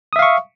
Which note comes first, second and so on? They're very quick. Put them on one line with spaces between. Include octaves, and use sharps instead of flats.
D#6 E5 F5 C#6